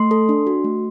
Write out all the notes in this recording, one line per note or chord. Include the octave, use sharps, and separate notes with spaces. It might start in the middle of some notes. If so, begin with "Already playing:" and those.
Already playing: A3 C6
A4
D4
F#4
A3